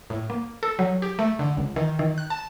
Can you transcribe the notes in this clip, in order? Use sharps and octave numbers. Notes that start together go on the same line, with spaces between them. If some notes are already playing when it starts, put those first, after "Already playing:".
A2
A#3
A4
F#3
G4
A3
D3
C#2
D#3
D#3
F#6
A5